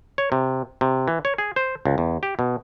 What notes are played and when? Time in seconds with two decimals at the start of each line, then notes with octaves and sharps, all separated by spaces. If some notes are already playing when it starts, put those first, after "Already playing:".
0.18 C#5
0.32 C3
0.81 C3
1.08 E3
1.25 C#5
1.38 G#4
1.56 C5
1.85 C#2
1.98 E2
2.23 G4
2.39 B2